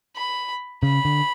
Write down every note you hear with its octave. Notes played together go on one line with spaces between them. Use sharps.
B5
C#3 B5
D3